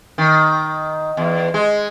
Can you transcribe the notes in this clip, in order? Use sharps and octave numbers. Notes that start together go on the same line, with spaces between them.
D#3
E2
G#3